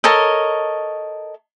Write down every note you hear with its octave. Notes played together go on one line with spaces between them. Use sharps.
A4 A#4 C#5 D#5